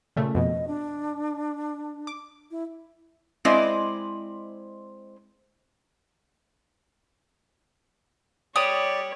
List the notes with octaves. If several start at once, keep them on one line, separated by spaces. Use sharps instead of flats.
A#2 C#3 A3
F2 B2 D#5
D4
D6
E4
G#3 C4 E4 C5 D5 D#5
G3 G4 B4 C#5 D5 D#6